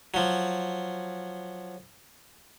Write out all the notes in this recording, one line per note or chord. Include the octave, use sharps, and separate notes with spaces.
F3 F#3